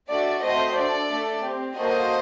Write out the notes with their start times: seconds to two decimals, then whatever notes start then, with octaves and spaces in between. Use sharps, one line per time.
0.10 A3 D4 F#4 A4 D5
0.44 A3 C4 F#4 A4 C5 D#5
0.77 D4 A4 D5
1.10 A3 D4 A4
1.44 C4 G4
1.77 A#3 F#4 A4 C5 D#5